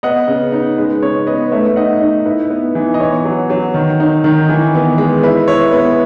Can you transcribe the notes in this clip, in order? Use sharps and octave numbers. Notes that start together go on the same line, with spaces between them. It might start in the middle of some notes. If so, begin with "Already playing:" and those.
B3 D#5 F#5
C#3
D#4
G#3 B4
C#3 C#5
B3 B4 D#5
A3 C#5 E5
D#4 D#5 F#5
D#4
E4 B4
B3
E3
D#5
B3 C#5
F#3
F#3
D#3
D#4
D#3
E3
B3
G#3
E4 B4
E4 C#5
B3 B4